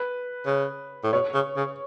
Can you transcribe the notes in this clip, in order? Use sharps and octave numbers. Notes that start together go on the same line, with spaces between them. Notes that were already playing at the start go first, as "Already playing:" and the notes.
Already playing: B4
C#3
A2
B2 C#5
C#3
C#3